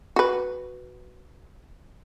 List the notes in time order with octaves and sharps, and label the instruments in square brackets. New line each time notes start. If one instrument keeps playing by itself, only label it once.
[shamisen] F#4 B4